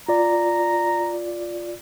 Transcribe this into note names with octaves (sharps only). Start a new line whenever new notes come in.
F4 D5 A#5